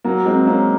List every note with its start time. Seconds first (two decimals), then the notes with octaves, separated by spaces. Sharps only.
0.04 F#3 A#3
0.25 G#3 C4
0.47 A#3 C#4